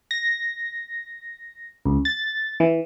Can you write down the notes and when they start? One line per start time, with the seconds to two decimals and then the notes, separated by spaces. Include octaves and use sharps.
0.11 A#6
1.86 C#2
2.05 A6
2.60 E3